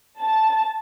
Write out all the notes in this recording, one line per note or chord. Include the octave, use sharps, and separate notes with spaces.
A5